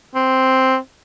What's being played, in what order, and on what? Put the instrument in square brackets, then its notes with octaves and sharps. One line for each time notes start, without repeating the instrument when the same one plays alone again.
[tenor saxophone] C4